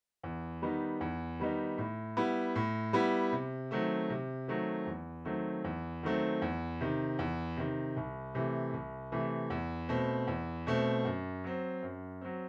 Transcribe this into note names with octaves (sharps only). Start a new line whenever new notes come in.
E2
D#3 G3 B3 D#4
E2
D#3 G3 B3 D#4
A2
G3 B3 E4
A2
G3 B3 E4
C3
D#3 F#3 A3 C4
C3
D#3 F#3 A3 C4
E2
D#3 F#3 A3 C4
E2
D#3 F#3 A3 C4
E2
C3 D#3
E2
C3 D#3
C2
C3 E3 A3
C2
C3 E3 A3
E2
B2 A3 C4
E2
B2 A3 C4
F#2
F#3 C4
F#2
F#3 C4